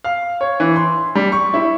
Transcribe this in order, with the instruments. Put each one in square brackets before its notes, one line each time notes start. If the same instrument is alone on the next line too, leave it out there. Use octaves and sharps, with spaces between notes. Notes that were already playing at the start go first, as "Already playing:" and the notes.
[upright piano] F5
C#5
E3
C6
G3
C#6
E4